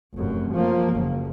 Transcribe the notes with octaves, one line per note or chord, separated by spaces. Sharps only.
F1 F#2
F3 A#3
F#1